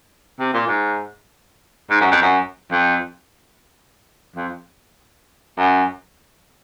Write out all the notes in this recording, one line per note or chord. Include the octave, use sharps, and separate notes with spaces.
C3
A#2
G#2
G#2
F#2
F2
F#2
F2
F2
F#2